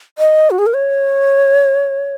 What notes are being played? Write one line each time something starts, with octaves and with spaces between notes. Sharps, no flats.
D#5
F#4
G#4
A#4
C#5